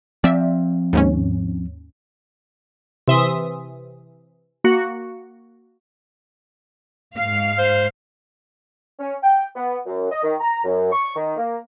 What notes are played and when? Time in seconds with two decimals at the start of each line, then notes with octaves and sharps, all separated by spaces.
0.24 F3 C4 D5 E5
0.93 D#2 G#2 C#4
3.08 C3 E3 E5 C6 D#6
4.64 A#3 F#4 C#7
7.15 G#2 F5
7.58 C5
8.99 C#4
9.23 G5
9.55 B3
9.86 F#2
10.10 D#5
10.23 D#3
10.40 A#5
10.64 F#2
10.91 C#6
11.15 D#3
11.37 A#3